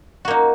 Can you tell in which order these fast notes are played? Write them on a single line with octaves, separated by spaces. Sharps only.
F#4 A#3 D#4